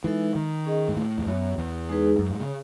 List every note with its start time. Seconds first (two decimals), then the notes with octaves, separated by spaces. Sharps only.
0.04 E3 G#3 D#4 A4 E5
0.35 D#3
0.65 C#4 G#4 D#5
0.88 G#2
0.96 A2
1.18 E2
1.26 F#2 B3 F#4 C#5 E5
1.58 E2
1.89 G#3 D#4 G#4 B4
2.19 F#2
2.30 G#2
2.40 C#3